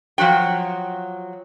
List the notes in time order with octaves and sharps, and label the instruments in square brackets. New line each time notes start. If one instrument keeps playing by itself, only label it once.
[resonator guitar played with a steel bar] F3 F#3 F#4 G5